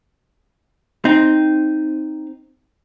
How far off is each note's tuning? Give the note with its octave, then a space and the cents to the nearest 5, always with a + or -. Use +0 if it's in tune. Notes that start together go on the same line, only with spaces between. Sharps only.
C4 +0 D#4 +0